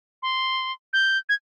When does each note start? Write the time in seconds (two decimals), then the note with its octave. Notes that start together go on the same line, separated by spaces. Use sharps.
0.23 C6
0.93 G6
1.29 G#6